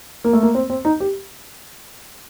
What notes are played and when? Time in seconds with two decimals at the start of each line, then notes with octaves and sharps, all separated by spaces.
0.24 A#3
0.33 A3
0.43 A#3
0.55 C4
0.70 C4
0.85 D#4
1.00 G4